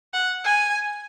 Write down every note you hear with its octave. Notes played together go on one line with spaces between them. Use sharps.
F#5
G#5